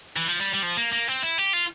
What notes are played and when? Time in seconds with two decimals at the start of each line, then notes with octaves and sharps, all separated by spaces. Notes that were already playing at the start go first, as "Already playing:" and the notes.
0.17 E3
0.28 F3
0.40 G3
0.54 G3
0.63 F3
0.77 A#3
0.92 A#3
1.08 C4
1.23 E4
1.38 G4
1.53 F4